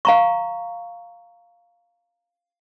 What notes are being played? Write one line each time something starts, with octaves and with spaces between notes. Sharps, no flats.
F5 A#5 C#6